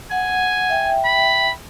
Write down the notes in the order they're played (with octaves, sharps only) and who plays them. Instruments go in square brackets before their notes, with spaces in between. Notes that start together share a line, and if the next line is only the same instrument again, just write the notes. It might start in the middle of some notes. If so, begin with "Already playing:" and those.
[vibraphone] F#5 [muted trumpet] G#5
[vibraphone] E5 G5
[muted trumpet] B5